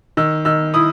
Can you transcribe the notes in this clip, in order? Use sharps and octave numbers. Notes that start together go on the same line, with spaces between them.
D#3 E6
D#3 E6
E4 D#6